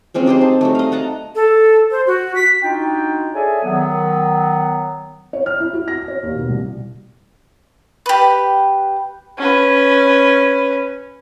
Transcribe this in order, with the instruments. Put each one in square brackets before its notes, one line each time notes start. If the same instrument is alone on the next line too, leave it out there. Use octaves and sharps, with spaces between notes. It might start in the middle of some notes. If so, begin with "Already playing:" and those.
[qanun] F3 G#3 C4 C#4
D#4 G4 G#4 C5
G#4 A5
F#3 G3 A3
D#5 F5
D#5 F#5 A5 A#5
[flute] A4
C5
F#4
B6
[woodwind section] D4 D#4 F4 F#4 G5
G#4 A4 C#5 D5 E5 G#5
D#3 F#3 B3
[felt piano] C#5
F6
E4
F#4
A#6
C#5
D#2
B2
C2
[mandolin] G4 B4
[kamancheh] C#4 B4